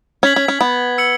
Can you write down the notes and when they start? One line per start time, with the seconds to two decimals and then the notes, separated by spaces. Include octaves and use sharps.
0.23 C#4 G#6 B6 F#7
0.36 C#4
0.48 C#4
0.61 B3
0.98 E6 C#7 F#7